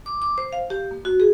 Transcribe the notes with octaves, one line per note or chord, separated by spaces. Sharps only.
D6
D6
C5
F5
G4
A#3
F#4
G#4